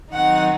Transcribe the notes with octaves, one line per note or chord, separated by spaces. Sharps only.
D#3 F#3 C4 D#4 F#5